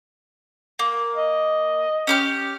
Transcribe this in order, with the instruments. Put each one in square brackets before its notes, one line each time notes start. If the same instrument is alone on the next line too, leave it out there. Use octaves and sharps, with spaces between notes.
[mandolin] A#3
[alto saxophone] D#5
[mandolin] C#4 G4 F6